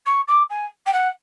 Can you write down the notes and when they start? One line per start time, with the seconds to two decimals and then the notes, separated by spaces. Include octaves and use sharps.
0.06 C#6
0.27 D6
0.49 G#5
0.86 G5
0.93 F#5